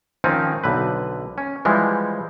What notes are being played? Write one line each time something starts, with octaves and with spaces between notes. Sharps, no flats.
D#3 F3 C4 C#4 D#4
B1 D3 B4
C#4
E3 F3 G3 G#3